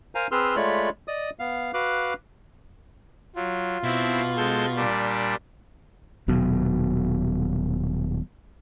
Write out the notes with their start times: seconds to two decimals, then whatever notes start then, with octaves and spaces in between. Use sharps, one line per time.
0.15 A#4 C5 F5 G#5 A#5
0.31 C4 G#4 B4 C6 E6 F6
0.56 G#3 A3 F4 C#5 D5 B5
1.08 D5 D#5 D#6
1.39 B3 F5
1.74 F#4 B4 F5 D6 F#6
3.35 F#3 F4
3.83 B2 C4 E4
4.37 G#3 A4 G6
4.76 A#2 G3 D4
6.28 D#1 B2 F#3